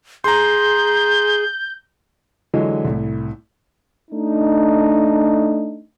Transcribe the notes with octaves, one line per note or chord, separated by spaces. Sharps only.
G#4 A#5 C6 G6
D3 E3 F#3 G#3 F4
C2 A2
A3 D4 D#4